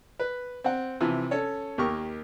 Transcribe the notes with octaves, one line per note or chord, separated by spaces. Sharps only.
B4
C4 F#5
C3 E3 F3
C#4 A4 C#5
D#2 G4 A#4 C#6